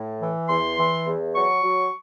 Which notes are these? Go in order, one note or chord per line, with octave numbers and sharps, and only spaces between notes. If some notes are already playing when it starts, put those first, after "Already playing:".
Already playing: A2
E3
E2 C6
E3
E2
F#3 C#6
F#3